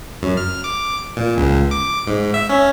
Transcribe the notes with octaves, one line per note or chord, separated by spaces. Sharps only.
F#2
F6
D6
A#2
C#2
D6
G#2
E5
C#4